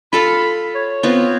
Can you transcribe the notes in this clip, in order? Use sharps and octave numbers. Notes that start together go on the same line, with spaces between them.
F4 A4 F5 B5
C#5
B3 C4 F4